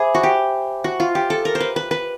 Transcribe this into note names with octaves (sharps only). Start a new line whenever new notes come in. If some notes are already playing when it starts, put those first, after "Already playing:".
Already playing: G#4 C5 E5 G#5 B5 D6
F#4
G4
F#4
F4
G4
A4
A#4
C5
B4
B4
B4